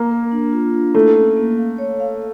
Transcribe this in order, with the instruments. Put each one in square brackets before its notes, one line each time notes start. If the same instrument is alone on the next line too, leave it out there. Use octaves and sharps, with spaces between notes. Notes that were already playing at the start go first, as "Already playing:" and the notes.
Already playing: [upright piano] A#3
[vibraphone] A#4
D4
F4
D4
[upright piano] A3 [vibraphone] E4
[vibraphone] C#4
A#3
F5
C#5
F5